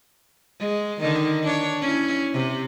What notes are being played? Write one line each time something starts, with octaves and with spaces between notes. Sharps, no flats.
G#3
D3 D#3 D#4
D4 C#5
C#4 E4
C3